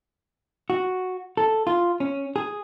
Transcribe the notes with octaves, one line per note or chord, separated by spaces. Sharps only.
F#4
A4
F4
C#4
G#4